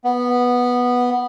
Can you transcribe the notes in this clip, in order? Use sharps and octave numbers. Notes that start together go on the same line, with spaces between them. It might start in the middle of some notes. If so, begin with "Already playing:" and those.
B3